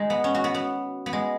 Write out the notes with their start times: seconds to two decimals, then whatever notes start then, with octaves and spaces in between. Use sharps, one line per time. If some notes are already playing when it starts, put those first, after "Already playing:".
Already playing: G#3 D#4
0.10 B3
0.24 C#4
0.35 F#4
0.44 B3
0.54 B3
1.06 B3
1.13 G#3